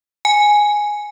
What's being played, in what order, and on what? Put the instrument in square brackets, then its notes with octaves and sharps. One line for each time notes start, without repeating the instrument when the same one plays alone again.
[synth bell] G#5